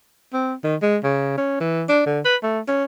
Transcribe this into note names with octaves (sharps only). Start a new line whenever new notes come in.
C4
D#3
G#3
C#3
C#4
E3
D4
D3
B4
A3
C#4